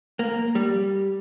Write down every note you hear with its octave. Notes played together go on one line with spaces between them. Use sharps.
A#3
G3